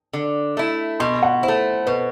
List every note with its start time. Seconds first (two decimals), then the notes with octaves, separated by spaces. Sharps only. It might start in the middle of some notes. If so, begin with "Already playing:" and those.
0.13 D3
0.57 A3 E4
1.00 B2 C6
1.23 F#5
1.43 E4 C5
1.48 A3
1.86 B2 B4